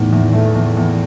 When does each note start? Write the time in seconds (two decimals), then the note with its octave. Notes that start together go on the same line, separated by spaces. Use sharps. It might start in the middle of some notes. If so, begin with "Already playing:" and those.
Already playing: E2 A2 D#3
0.12 E2
0.33 A3
0.55 E2
0.77 E2